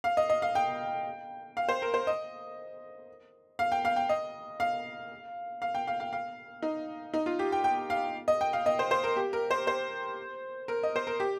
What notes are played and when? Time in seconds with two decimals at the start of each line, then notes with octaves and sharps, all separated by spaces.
0.04 F5
0.17 D#5
0.29 D#5
0.42 F5
0.55 G5
1.57 F5
1.69 C5
1.82 A#4
1.94 C5
2.07 D#5
3.59 F5
3.72 G5
3.85 F5
3.96 G5
4.09 D#5
4.60 F5
5.62 F5
5.75 G5
5.87 F5
6.00 F5
6.13 F5
6.62 D#4
7.14 D#4
7.26 F4
7.39 G4
7.52 G5
7.64 G5
7.90 F5
8.28 D#5
8.41 G5
8.53 F5
8.66 D#5
8.79 C5
8.91 C5
9.04 A#4
9.17 G4
9.33 A#4
9.51 C5
9.67 C5
10.68 A#4
10.83 D#5
10.96 C5
11.07 A#4
11.20 G4